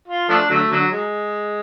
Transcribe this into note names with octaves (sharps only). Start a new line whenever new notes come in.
F4
F3 A3 D4
D3 F#3 A3
D3 F#3
G#3